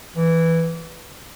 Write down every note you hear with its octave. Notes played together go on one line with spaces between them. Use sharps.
E3